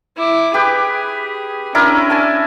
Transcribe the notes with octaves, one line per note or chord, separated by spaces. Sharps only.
E4 D6
G4 G#4 B4
C#4 D4 E4 A#4
G#5 A5